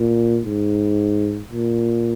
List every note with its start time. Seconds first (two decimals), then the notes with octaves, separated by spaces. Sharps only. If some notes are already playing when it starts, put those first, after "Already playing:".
Already playing: A#2
0.46 G#2
1.52 A#2